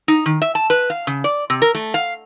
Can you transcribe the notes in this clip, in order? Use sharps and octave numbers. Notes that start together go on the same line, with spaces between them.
D#4
D#3
E5
A5
B4
F5
C#3
D5
C3
A#4
A3
F5